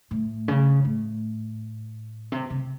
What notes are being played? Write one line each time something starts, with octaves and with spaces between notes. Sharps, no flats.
A2
C#3
A2
C3
C3